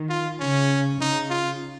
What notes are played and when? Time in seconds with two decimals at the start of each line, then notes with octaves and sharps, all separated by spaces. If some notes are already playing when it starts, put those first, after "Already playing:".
Already playing: D#3
0.09 F4
0.40 C#3 C#4
1.00 C#3 D#4
1.30 F4